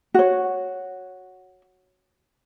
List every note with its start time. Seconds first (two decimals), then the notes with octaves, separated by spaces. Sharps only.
0.14 F#4 C#5